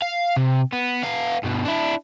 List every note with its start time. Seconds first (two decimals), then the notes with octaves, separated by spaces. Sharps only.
0.02 F5
0.36 C3
0.73 B3
1.04 B3 F5
1.43 G2 B2
1.65 D4 E4